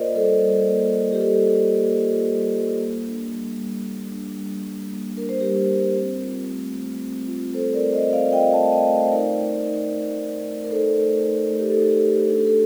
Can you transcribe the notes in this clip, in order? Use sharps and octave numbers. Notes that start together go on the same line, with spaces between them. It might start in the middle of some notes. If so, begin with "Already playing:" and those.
Already playing: A#3 F4 A#4 C5 D5 D#5
G3 A4 C5
G3 A4
A#3
F4
G4
G3 A4
G3
A#3
F4
G3
G3
A#3
D4
G3
G3
A#3
D4
G3
G3
A#3
D4 A#4
C5
G3 G4 A#4
G3
C4
F4
A3
A3
C4
F4
A3 A4 C5
A#4 D5
A3
C5 D#5
C4
D5 F5
F4 D#5 G5
F5 A5
A3
D#5 G5
A3
C5
D#4 A#4 D5
A3
D#4
A3
D#4
A3
A#4
D#4 A4 C5
A3
D#4
A3
G4
A4
D#4
G4
A3
A4
D4 A4
G4
A4